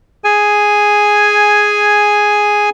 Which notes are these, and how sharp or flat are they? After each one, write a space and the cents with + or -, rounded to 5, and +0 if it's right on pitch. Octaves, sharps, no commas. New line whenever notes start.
G#4 +0 G#5 +0